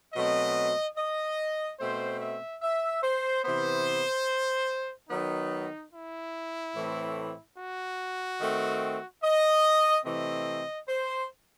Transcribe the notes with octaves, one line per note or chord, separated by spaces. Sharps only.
B2 F#3 A3 C4 D#5
D#5
B2 A3 C4 C5
E5
E5
C5
C3 E3 B3 C5
D#3 F#3 B3 D#4
E4
A2 E3 A3 C4
F#4
D#3 A3 C4
D#5
C3 E3 A3 C4 D#5
C5